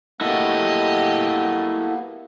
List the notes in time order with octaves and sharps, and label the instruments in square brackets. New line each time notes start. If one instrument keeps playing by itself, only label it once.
[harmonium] A#3 B3 [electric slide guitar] E4 F#4 A4 [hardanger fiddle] G4 D#5